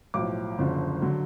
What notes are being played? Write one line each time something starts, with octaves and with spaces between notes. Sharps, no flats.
B1 A2 F3 D6
F#1 F#2 D3 F3
D3 F#3